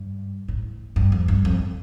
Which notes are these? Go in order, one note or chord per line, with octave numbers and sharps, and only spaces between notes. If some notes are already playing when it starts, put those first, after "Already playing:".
Already playing: G2
A2
G2
F2
G2
F2